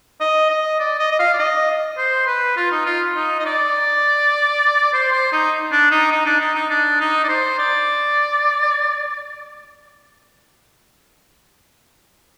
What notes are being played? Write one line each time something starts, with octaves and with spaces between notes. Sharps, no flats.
D#5
D#5
D5
D#5
D#5
F5
D5
D#5
C5
B4
F4
D#4
F4
D#4
D#5
D5
C5
C5
D#4
D4
D#4
D#4
D4
D#4
D#4
D4
D#4
D5
C5
D5